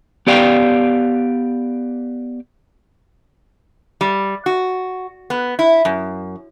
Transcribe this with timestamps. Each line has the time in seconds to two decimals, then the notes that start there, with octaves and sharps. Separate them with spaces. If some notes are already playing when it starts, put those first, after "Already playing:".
0.27 B3 G4 D5 F5 G5
4.01 G3
4.46 F#4
5.30 B3
5.59 E4
5.85 F#2